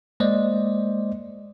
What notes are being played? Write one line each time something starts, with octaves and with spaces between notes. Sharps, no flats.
G#3 A#3 C5 D5 D#5